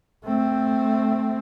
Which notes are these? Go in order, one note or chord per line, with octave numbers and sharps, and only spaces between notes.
A3 C4